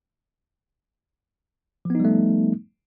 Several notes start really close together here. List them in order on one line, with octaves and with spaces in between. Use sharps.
F3 B3 D#4 G3 A3